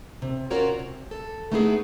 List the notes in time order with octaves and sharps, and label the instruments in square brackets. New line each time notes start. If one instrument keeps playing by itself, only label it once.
[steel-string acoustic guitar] C3
C#4 F4 F#4 A#4 C#5 D5
C3
A4
A3 B3 D#4 E4 G4 G#4